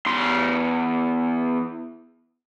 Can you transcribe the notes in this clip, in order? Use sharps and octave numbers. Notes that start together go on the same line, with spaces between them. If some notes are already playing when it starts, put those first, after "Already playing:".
E2 C6